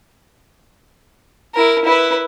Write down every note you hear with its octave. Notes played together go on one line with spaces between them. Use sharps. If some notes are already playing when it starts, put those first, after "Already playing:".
E4 A#4
E4 B4